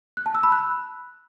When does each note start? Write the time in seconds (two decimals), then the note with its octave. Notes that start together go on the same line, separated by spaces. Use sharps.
0.17 F#6
0.26 A5
0.35 E6
0.43 B5
0.52 F#6